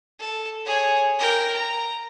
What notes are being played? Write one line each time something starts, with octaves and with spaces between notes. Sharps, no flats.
A4
G#4 C#5
A#4 G5
A#5